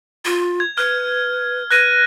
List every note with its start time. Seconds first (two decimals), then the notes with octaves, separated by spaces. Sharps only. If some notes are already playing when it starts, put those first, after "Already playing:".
0.25 F4
0.60 G#6
0.78 B4 F6
1.71 B4 F#6 A#6 D#7